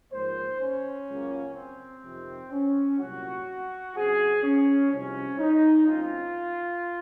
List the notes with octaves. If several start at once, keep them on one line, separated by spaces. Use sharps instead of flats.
G#2 F3 A#3 C5
C#4
C#2 C#3 F#3 A#3
C4
F2 C3 D#3
C#4
C2 A#2 F#3 F#4
F#2 C#3 F#3 C4 G#4
C#4
C2 C3 F3 G#3 C#4
D#4
F#1 F#2 C#3 G#3 C4 F4